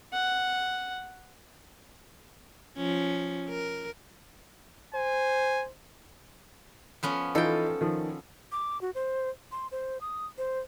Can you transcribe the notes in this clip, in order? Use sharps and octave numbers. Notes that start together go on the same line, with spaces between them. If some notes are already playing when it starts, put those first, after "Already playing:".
F#5
F3 C#4
A#4
C5 G#5
F3 B3 C#4
E3 D#4 F4 A4 G5
D#3 F3
D6
F#4
C5
C6
C5
D#6
C5